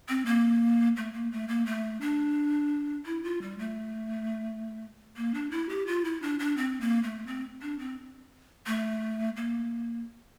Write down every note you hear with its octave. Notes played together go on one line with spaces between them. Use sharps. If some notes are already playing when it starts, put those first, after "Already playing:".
C4
A#3
A3
A#3
A3
A#3
A3
D4
E4
F4
G3
A3
A#3
D4
E4
G4
F4
E4
D4
D4
C4
A#3
A3
C4
D4
C4
A3
A#3